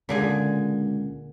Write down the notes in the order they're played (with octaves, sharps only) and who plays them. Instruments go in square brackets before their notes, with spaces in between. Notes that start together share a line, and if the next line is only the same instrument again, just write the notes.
[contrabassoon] C#2 [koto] A#2 D3 G#4